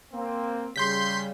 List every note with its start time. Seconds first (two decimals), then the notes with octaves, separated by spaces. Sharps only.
0.12 A#3 C4
0.76 C#3 G3 C6 G6 B6